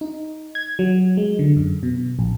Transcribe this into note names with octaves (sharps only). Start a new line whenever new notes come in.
D#4
G#6
F#3
G#3
D3
F#2
B2
A#1